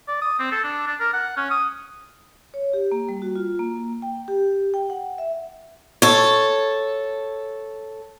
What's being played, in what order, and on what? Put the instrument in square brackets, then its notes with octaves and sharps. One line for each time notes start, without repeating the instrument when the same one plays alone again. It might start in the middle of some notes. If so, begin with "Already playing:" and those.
[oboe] D5
D#6
C4
A4
D4
D4
A#4
F#5
C#4
D#6
[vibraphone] C#5
G4
A#3
G3
F#4
F4
A#3
G5
G4
G5
F#5
E5
[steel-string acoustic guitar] A4 C#5